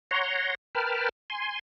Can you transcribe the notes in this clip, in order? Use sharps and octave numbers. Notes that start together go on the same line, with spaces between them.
C#5 F#5 A#5 C6
A#4 B4 G5 A5 B5 F6
G#5 C6